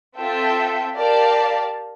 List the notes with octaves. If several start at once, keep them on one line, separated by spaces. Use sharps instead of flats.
C4 F4 A4 E5 G5
G4 A#4 D5 F5 A5